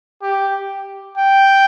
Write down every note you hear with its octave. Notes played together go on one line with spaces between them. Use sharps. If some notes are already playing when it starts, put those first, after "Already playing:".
G4
G5